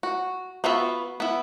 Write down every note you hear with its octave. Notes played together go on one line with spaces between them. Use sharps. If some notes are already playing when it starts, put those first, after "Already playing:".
F#4
B3 F4 F#4 E5
B3 E4